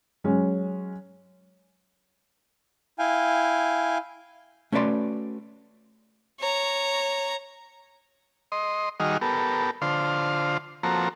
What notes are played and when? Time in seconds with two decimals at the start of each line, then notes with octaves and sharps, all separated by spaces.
0.24 F#3 G#3 C#4
2.99 E4 F5 G5 G#5
4.72 A3 C#4 F#4 B4 D5 C6
6.40 C#5 A#5
8.52 D#5 C6
9.00 D#3 G3 F#4 G#4 D#5 F6
9.21 B3 G4 A4 A#4
9.82 D3 F4 C5 F5
10.83 F3 A#3 C4 F#4 A4 A#5